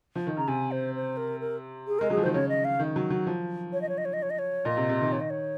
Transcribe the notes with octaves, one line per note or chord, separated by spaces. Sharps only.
F3
D#3
C#3 A#5
C3 G#5
C5
C5
A#4
A#4
G#4
G#3 A#4
F#3 G#4
F3
D#3 C5
C#3 C#5
D#5
F5
D#3
F#3
F#3
F3
C#5
D#5
C#5
D#5
C#5
D#5
C#5
D#5
C#5
A#2 D#5
C3
C3
D#3
C#5
D#5
C#5